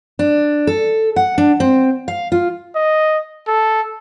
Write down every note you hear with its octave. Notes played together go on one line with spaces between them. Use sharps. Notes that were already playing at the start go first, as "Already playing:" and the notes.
D4
A4
F#5
D4
C4
F5
F4
D#5
A4